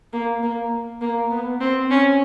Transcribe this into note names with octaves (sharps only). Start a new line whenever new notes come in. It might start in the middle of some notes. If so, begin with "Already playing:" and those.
A#3
A#3
A#3
B3
C4
C#4